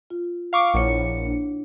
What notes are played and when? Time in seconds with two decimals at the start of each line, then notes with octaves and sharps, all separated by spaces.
0.10 F4
0.53 F5 C#6 D6
0.74 A#1 E4 C#5 F#5 C#7
1.25 D4